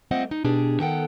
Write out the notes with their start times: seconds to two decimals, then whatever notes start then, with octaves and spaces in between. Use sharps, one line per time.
0.11 A3 A#3 C4 F4 D#5 F#5
0.31 D#4
0.44 B2 D4 G4 G#4
0.80 D#3 B3 A4 F#5 G5